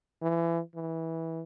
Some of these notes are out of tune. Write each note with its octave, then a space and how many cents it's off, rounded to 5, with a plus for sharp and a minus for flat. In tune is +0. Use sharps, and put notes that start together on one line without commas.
E3 +25
E3 -15